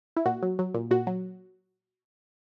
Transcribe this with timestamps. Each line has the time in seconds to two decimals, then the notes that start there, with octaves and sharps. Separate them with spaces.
0.17 E4
0.26 A#2 F#4
0.43 F#3
0.59 F#3
0.74 A#2
0.91 A#2 F#4
1.07 F#3